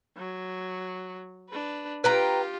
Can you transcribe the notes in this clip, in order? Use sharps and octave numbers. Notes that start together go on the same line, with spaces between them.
F#3
D4 B4
F4 G4 B4 G5 A#5